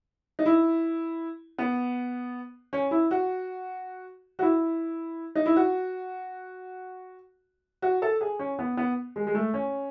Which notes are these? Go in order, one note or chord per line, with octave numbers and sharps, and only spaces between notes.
D#4
E4
B3
C#4
E4
F#4
F#4
E4
D#4
E4
F#4
F#4
A4
G#4
C#4
B3
B3
G#3
G#3
A3
C#4